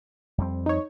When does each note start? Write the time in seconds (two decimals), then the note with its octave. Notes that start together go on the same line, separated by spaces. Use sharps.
0.38 F2 G3 C4
0.66 D#4 C#5